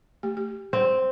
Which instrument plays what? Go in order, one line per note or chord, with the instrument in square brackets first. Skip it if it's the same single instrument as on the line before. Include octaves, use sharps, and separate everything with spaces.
[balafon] A3 G4
G4
[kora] C4